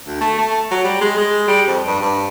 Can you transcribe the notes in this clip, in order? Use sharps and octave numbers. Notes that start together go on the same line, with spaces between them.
D2
A3
A3
F#3
G3
G#3
G#3
G3
F2
G2
G2